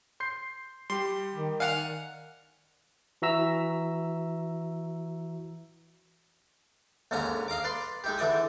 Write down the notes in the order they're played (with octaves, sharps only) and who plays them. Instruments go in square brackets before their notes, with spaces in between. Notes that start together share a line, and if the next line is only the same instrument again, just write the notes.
[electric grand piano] C6 G6 C7
[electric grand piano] G3 G4 [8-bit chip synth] C6
[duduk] D#3
[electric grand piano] D5 G#5 [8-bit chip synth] F5 F#5 F6
[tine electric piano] E3 F#4 E5 A#5 E6
[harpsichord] D#2 G#2 D3 C#4 G#5 A#5
D#5 F5 A#5 D6
B4 D5 C6
G#3 D#4 G4
D3 E3 D5 D#5 D#6